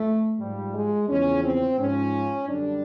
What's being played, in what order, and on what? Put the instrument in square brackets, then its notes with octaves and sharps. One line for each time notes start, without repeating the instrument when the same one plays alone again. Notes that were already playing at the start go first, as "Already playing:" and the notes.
Already playing: [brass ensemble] F2 A3
G#2 F3 G3
G#3
E2 C#3 F3 C#4
C4
G#2 F3 C#4
F#2 D3 G3 D4